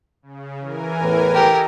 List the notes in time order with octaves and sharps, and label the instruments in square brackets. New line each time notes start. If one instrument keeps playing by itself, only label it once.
[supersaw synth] C#3
E3 A#4 G#5
[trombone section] E2 A2 B4
[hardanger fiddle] G4 A#4 [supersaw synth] A4 D#5 A#5